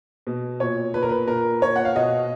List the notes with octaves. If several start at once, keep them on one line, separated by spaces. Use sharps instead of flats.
B2
A#2 C#5
A#2 B4
A#4
B4
A#2 A#4
A#2 C#5
F#5
F5
B2 D#5